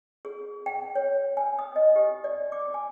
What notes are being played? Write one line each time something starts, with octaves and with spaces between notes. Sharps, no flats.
G#4
G5
C#5
G#5
D#6
D#5
G4
D5
D6
G#5